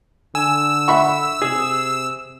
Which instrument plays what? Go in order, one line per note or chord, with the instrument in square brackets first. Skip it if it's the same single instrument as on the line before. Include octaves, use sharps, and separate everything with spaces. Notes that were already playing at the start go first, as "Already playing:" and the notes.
[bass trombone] D3 [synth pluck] G#5 [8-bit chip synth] E6
[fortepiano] E5 B5 C#6 [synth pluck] F#5
[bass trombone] C3 [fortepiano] G#4